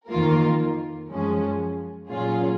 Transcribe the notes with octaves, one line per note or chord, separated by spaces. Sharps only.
F2 D#3 A#3 F4 A#4
F#2 F3 G#3 C#4
A#2 F#3 C#4 F4 G#4